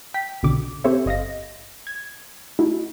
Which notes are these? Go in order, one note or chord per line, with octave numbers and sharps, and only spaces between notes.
G5 B6
B1 B2 D3 D6
C4 G4 A4 C5 C#5 E5
G1 D#5 F5 A#6
G#6
A3 D#4 E4 F#4